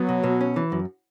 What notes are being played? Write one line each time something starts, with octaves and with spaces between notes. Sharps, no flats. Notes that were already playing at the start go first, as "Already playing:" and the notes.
Already playing: F#3 B3
B2
B2
C#4
E3
F#2